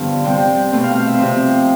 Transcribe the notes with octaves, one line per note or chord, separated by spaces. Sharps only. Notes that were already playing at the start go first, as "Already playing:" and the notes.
Already playing: G2 D3 F3 B3 D4
C3 G3 C4 G5
B2 A3 C4
F5
F5
E5
C3 F3 C4